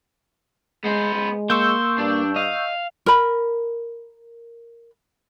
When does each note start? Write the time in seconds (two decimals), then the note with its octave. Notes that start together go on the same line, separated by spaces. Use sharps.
0.84 G#3 B3 C5
1.14 G#3
1.50 A#3 C6 C#6 E6 G6
1.98 G2 D4
2.36 D#5 F5
3.06 A#4 B5